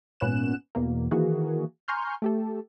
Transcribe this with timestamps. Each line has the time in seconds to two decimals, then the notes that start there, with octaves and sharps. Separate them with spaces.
0.20 G#1 A#2 B3 C#4 F#6 E7
0.75 E2 B2 A#3
1.11 D#3 E3 A#3 F#4 G#4
1.88 G#5 A#5 C6 C#6 F6 G6
2.22 A3 G4 A4